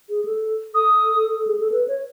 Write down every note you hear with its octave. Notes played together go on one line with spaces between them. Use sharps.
G#4
A4
A4 D#6
G#4
A4
B4
C#5